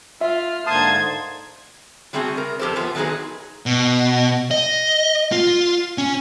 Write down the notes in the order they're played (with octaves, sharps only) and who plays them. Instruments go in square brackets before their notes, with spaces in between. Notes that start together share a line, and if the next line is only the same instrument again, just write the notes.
[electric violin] F4 F6 [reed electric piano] E5
[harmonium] G#2 D3 A#3 [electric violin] C5 G#6 [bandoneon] A5 C6 D#6
[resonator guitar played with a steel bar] F#3 G3 A3 C4 F#4 G#4
C#3 A#4
F2 G4 A4 C5
E2 F3 B3
D#3 F#3 B3 C#4 D#4 G#4
[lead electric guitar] B2
D#5
F4
C#4